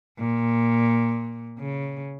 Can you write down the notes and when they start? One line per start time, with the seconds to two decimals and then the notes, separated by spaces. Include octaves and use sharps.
0.19 A#2
1.59 C#3